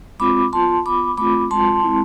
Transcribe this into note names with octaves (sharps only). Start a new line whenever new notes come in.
G#3 C4 F4 B5 D6
B3 F4 A5 C6
B3 F4 B5 D6
A3 C4 F4 B5 D6
G#3 C4 F4 A5 C6
G#3 C4 E4